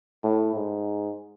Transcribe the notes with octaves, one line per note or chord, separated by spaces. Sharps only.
A2
G#2